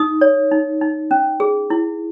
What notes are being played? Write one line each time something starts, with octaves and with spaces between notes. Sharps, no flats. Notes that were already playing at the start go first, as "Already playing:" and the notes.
Already playing: D#4 D#6
C#5
D#4
D#4
C#4
G#4
E4